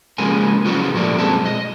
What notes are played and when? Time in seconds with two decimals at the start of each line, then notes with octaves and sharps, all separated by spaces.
0.18 C#3 F3 G#3 A#3 G#5
0.65 C#3 F3 F#3 B3 F4 F#4
0.94 A#2 F3 A3 A#3 D5
1.19 F#2 B2 G#3 C4 G#4 A5
1.46 D#5